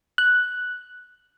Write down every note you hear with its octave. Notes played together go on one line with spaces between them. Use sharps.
F#6